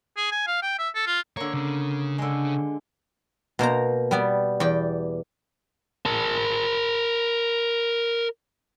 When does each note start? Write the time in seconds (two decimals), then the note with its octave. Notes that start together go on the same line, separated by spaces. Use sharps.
0.17 G#4
0.31 G#5
0.47 F5
0.62 G5
0.79 E5
0.95 A4
1.07 F4
1.37 D3 A#3 C#5
1.54 C#3 C#4
2.18 D3 G#3
3.59 B2 A#3 C5 A#5
4.11 G3 B3 D5
4.60 E2 D5 G5
6.06 A#4 A5